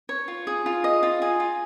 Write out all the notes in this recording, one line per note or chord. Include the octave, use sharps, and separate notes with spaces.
C#5
F4
G#4
F4
D#5
F4
G#4
F4